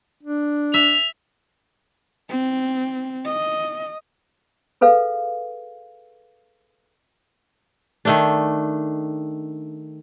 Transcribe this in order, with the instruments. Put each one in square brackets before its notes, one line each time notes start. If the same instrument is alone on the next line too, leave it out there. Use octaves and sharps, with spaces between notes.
[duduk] D4
[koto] E5 [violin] F7
[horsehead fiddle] C4
D#5
[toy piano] G#4 A4 B4 F5
[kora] D#3 A3 D4